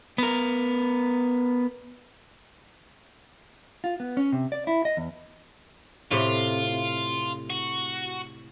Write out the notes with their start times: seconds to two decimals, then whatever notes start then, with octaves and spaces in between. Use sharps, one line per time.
0.18 B3 A#4
3.84 F4
4.00 B3
4.17 C#4
4.32 C3
4.52 D5
4.67 E4
4.85 D#5
4.97 E2
6.11 A2 C3 F4
7.50 F#4